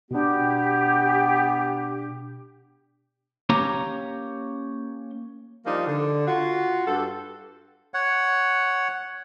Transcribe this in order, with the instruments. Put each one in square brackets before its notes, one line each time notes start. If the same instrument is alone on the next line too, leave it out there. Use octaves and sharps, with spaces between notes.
[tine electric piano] B2 D4 [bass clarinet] B3 [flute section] G4
[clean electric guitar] A#3 C#4 G4 C#5 A#5
[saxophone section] F3 G3 A#3 D4 D#4
D3
F4 F#4
G2 G3 A4
[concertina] C#5 F#5